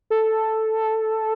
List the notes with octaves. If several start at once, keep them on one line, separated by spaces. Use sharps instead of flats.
A4